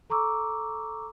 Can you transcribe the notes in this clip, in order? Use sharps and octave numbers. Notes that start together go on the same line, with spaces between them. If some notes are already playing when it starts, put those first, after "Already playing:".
A4 A#5 C#6 D6 E6